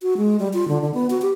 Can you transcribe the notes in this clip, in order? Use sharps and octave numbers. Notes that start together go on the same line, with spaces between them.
F#4
G#3
G3
F4
D3
D3
B3
F#4
G4